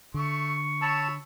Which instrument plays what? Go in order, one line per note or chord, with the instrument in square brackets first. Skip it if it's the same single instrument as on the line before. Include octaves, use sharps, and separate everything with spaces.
[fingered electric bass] D3 [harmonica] A3 [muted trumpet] C#6
[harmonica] C#5 B5 E6 [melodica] A5